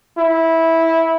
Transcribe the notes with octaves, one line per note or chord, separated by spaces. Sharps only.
E4